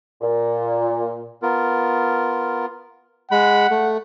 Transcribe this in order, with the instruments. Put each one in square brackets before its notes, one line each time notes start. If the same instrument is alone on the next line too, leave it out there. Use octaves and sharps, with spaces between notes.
[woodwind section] A#2
[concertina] B3 F4 A#4
[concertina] G#3 B5 [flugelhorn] F#5
[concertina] A3